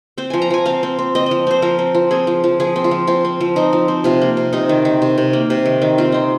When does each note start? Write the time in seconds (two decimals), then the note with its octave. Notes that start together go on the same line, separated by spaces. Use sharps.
0.18 C4 C5
0.30 F3 G#5
0.42 A#5
0.50 F3 G#5
0.66 C4 F5
0.83 C4
0.99 C4
1.15 C4 D#5
1.26 F3 D#5
1.47 C4 C5
1.62 F3 A#4
1.79 C4
1.95 F3
2.11 C4 G#4
2.27 F3
2.44 F3
2.60 F3 G#4
2.76 C4
2.84 F4
2.91 F3
3.07 C4 F4
3.25 C4
3.41 F3
3.56 C4 D#4
3.73 F3
3.88 C4
4.04 C3 F4
4.22 A#3
4.37 C3
4.53 C3 D#4
4.69 D#3
4.85 D#3
5.02 C3
5.18 C3
5.33 A#3
5.50 C3
5.66 D#3
5.82 D#3
5.98 C4 F4
6.12 C4 D#4